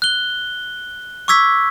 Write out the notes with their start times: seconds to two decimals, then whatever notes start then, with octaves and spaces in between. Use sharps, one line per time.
0.02 F#6 G7
1.28 C#6 D6 E6 G#6 B6